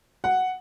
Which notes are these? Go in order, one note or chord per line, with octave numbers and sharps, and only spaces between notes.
F#5